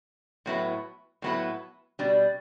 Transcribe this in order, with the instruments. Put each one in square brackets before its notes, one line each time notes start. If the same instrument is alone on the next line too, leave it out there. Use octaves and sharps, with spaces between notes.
[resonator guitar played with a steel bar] A2 F#3 B3 E4 B4
A2 F#3 B3 E4 B4
B2 G3 D4